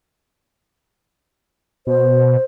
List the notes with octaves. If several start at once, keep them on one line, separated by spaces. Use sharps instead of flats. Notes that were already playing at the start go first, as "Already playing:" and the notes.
B2 C5